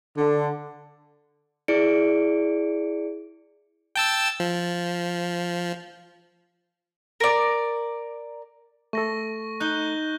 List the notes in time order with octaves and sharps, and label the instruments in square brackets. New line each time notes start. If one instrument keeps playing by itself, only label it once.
[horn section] D3
[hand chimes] E4 G#4 D5 C#7 D7
[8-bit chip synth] G5 A5 E6
F3
[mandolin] A#4 D5
[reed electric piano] A3 A4 [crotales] C#6 A#6
[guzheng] D#4 [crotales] F#6 G6 G7